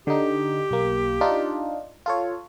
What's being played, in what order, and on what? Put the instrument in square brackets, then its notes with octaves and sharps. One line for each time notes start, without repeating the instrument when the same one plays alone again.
[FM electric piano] D3 D#4 [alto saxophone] G4
[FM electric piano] B1 A#3
D4 D#4 F4
F4 A4 C#5